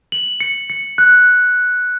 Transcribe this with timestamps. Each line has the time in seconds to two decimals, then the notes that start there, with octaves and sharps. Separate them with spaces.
0.12 F#7
0.40 C#7
0.70 C#7
0.98 F#6